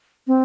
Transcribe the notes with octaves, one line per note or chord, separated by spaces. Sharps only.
C4